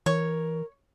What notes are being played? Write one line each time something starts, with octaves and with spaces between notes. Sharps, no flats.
E3 A#4 C#5